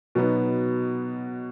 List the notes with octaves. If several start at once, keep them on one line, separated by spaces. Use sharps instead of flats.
B2 F#3 B3 D#4